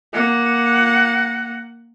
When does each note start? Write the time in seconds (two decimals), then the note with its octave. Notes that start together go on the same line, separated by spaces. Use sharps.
0.13 A#3 F#5